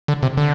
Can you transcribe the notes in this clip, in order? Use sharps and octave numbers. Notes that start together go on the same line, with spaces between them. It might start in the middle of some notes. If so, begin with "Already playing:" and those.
D3
C3
D3